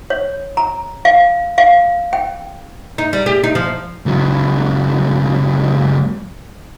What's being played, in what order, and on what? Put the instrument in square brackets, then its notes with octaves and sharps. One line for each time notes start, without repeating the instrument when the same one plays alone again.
[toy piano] C#5
A#5
F5
F5
G5
[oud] D#4
G3
G4
D#4
F3
[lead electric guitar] C#2 F#3